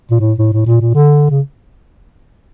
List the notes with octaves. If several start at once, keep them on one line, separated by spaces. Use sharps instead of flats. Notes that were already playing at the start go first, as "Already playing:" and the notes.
A#2
A2
A2
A2
A#2
A#2
D3
C#3